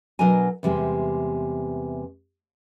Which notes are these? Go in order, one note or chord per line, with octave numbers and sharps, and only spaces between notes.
B2 F#3 D4 A#4 D#5 G#5
E2 C3 G3 G#3